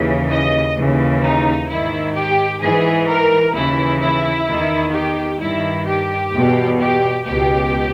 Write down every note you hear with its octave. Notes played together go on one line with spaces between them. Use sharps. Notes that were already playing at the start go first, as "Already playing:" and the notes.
Already playing: D#2 C#3 E3
D#5
D#2 C#3 E3
D#4
G#2 D#3 E4
G4
G#2 E3 G#4
A#4
D#2 C#3 E3 E4
E4
E2 D#3
G4
G2 D#3 E4
G4
E2 B2
G4
C#2 B2 G4